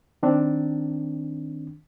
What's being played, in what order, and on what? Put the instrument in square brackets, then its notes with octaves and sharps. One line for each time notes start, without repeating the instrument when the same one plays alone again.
[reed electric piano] D#3 C4 D4